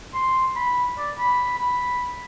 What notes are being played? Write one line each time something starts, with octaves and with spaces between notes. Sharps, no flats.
C6
B5
D5
B5
B5